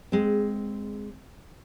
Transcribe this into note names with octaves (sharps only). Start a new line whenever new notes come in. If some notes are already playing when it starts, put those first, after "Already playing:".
G#3 C4